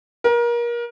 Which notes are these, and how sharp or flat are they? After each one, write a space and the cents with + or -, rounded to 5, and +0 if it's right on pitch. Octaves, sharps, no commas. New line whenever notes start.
A#4 +30